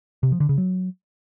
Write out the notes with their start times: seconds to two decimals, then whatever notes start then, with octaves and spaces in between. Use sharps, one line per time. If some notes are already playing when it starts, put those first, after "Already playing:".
0.23 C3
0.32 F3
0.40 D3
0.49 C#3
0.58 F#3